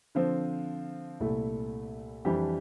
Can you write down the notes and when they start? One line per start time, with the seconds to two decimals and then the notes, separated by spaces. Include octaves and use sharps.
0.15 D3 F3 C4
1.20 C2 A#2 A3 E4
2.25 F2 E3 G3 D4 G4